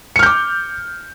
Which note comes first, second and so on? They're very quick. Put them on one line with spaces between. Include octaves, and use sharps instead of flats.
C#7 F6 G6 D6